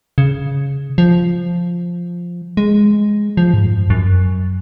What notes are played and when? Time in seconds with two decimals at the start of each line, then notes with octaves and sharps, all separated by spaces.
0.18 C#3
0.98 F3
2.57 G#3
3.37 F3
3.54 G#2
3.64 F#2
3.90 F#2